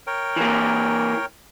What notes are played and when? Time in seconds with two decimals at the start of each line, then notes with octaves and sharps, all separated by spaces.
0.07 A#4 C#5 G5
0.36 E3 A#3